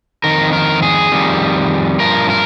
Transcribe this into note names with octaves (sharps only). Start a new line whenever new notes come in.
F2 D#3 A#4
A#4
G#4
F2 D#3 G3
G2 F3 A#4
A#4